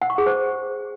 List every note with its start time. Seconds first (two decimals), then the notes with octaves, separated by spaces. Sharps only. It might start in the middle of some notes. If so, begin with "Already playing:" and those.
0.02 F#5
0.10 C#6
0.18 G#4
0.26 C5